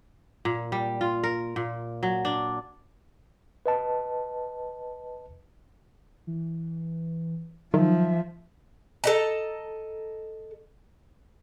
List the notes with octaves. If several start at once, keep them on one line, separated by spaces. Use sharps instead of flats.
A#2
G3
F4
A#4
A#2
F#3
D4
B4 D#5 A5
E3
D#3 F3 F#3 E5
A4 D#5 A#5